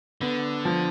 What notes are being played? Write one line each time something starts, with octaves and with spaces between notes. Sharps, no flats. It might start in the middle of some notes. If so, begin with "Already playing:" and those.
D3 B3
F3